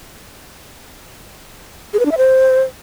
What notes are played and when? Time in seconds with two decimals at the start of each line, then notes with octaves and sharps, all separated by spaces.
1.93 G#4
1.99 B4
2.05 D4
2.11 E5
2.18 C5